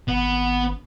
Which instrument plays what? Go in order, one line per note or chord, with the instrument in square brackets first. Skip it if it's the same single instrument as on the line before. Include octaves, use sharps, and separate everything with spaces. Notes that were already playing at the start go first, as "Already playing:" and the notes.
[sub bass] G#1 [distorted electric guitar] B3